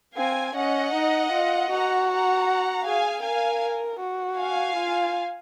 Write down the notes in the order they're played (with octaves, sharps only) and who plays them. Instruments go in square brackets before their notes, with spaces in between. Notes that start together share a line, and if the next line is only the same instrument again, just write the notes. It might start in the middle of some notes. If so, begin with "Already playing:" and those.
[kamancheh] C4 [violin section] F5 G#5
[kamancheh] C#4 [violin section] D#5 F#5
[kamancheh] D#4
F4
[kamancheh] F#4 [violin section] F#5 A#5
[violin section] F#5 A#5
[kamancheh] G#4 [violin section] F5 G#5
[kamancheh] A#4 [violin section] F5 G#5
[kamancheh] F#4
[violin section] F5 G#5
[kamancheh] F4